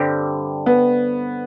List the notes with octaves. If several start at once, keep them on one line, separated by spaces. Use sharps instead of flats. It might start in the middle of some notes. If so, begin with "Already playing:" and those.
Already playing: G2 D3 G3 C4 G4
B3